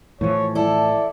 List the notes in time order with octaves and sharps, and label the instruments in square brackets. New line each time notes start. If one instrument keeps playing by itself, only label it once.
[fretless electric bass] A2 E3 F3 [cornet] C#5
[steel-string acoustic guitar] E4 A4 [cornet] D5